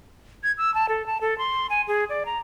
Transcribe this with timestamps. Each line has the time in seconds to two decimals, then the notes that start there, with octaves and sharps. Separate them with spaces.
0.43 G#6
0.58 E6
0.74 A5
0.89 A4
1.06 A5
1.21 A4
1.38 C6
1.70 G#5
1.87 G#4
2.09 D5
2.26 A#5